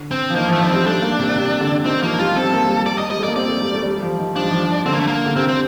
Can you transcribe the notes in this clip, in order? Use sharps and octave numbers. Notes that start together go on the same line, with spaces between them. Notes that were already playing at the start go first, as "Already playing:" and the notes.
Already playing: D3
C4
F3
D#3 A#3
F3
A3
F3 D4
G3 C4
A3 D4
A#3
C3
C3
D3
D#3 C4
F3 A#3
G3 F4
C4 A4
A#3
G3
D5
D#5
G3 D#5
A3
D5
A#3
C4 D5
A3
G3
A3
G3
F3
D#3
F3 D4
G3
F3
D3 C4
A#3
A3
A#3
D3
C3 C4
C4